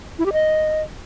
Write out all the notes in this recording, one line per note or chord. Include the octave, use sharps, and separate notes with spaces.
E4
G4
D#5